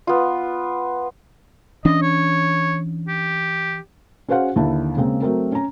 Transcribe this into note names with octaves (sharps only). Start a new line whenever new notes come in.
B3 F4
E3 C#4 D4 D#5
C#5
G4
C#4 F#4 G#4 C5 F5 F#5
D#2 D3 E4 A5
C#3 G#3 A#3 C4
F#3 A3 C4 A#4
C#4 A#5